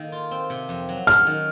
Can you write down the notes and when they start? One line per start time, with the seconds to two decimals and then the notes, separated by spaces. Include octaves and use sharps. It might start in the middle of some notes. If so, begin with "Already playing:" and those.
Already playing: D#3 A#3 A4
0.12 F4
0.31 C4
0.50 C3
0.69 F2
0.89 F#3
1.07 C#4 F6
1.27 D#3